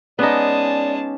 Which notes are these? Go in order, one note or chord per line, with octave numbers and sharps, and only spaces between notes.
G#3 B3 C#4 D#4 D5 A5 D6